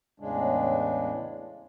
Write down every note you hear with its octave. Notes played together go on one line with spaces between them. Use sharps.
E2 A2 C#3 G#3 D4